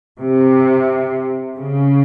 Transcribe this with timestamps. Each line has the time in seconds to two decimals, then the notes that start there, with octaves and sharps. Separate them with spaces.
0.20 C3
1.57 C#3